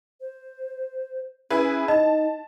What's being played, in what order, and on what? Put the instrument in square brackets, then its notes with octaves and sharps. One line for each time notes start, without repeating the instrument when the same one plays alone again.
[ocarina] C5
[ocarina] C#4 [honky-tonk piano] E4 G#4 B4
[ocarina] D#4 [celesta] D#5 [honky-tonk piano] A5